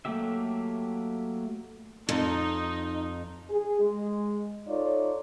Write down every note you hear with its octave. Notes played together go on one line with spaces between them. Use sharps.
F#3 A3 A#3 G4 E5
F2 D#4
G#4
G#3
D#4 F4 A4 C#5 D5